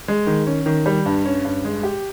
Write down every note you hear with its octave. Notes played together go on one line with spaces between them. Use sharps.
G#3
D#3
C#4
D#3
G3
G2
C#4
G2
G#3
G4